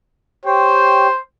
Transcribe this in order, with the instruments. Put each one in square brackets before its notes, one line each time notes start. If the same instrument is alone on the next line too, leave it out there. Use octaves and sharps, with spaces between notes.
[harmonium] G4 C#5 G5 [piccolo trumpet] C5